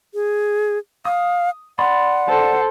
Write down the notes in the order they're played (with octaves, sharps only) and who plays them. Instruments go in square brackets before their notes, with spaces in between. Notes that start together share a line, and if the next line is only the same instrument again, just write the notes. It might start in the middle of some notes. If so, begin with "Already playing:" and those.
[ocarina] G#4
[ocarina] F5 [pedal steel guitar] D#6
[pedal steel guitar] D5 B5 C6 [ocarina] F#5
[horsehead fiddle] A4 C5